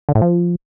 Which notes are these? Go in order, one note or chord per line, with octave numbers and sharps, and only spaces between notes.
D3
A2
F3